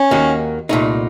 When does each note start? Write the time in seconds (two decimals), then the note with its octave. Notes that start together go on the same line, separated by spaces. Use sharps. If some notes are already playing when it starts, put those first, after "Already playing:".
Already playing: C#4
0.11 D#2 D#3 A#3 D#4 F#4
0.69 C2 A#2 A3 D#4